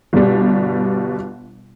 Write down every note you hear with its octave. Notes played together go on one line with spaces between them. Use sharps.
G1 B2 G3